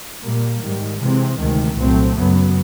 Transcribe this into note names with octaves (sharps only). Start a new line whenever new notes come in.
A#2 G3 A#3
G#2 D#3 G3
C3 E3 G#3 C4
D2 C3 D#3 G#3
C2 A#2 F#3 A3 C4
F#2 C#3 F#3 B3